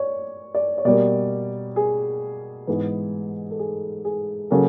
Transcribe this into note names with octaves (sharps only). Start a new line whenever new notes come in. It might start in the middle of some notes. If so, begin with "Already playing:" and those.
Already playing: C#5 D5
D5
C#5
B2 G3 A#3 D5
G#4
G#2 E3 G#3 B3
A4
G#4
G#4
C#3 F#3 A#3 A4